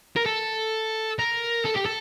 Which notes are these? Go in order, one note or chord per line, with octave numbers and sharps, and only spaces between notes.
A#4
A4
A#4
A4
G4
A4